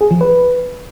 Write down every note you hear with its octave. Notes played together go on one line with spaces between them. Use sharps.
G#4
F3
B4